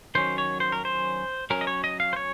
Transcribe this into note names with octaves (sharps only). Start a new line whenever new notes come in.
D#3 F#3 C#4 C5
C#5
C5
A#4
C5
F#3 C#4 A#4
D#5
C#5
D#5
F5
C5
C#5